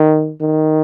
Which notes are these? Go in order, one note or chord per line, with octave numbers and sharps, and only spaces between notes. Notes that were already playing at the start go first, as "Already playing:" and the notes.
Already playing: D#3
D#3